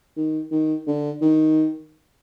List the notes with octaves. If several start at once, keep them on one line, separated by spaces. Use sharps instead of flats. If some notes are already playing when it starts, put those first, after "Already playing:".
D#3
D#3
D3
D#3